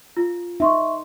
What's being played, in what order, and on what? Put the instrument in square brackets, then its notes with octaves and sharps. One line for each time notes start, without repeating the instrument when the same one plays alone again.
[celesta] F4
[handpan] D#4 [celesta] E5 C6 C#6